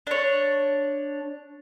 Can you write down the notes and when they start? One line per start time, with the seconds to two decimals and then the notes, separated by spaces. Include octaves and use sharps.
0.07 D4 C#5